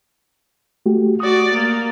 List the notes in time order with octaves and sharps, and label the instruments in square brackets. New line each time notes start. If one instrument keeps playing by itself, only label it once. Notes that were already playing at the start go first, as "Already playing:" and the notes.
[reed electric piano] A3 F#4 G4
[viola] F#4 D5 [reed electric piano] D#6
[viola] A#3